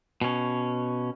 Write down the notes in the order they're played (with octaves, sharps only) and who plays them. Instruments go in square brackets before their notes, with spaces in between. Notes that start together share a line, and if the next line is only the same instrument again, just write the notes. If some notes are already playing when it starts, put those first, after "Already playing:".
[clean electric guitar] B2 C#4